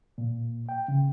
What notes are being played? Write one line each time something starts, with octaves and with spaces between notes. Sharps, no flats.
A#2
G5
C#3